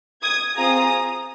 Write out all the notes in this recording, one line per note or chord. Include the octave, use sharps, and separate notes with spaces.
D#6 G#6
C4 F4 G#4 A#5 D#6